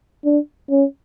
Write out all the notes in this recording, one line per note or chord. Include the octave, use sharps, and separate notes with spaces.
D4
C#4